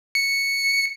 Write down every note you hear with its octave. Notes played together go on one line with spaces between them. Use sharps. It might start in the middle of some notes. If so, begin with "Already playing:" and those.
C#7